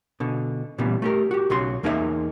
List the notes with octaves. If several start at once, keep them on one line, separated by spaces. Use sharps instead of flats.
B2 D3
A#2 C#3 E3 G3 B3
A3 G4 A#4
F#4 G4
B1 C#3 F#4 C6
E2 A#3 D#4 G#4 B4 E5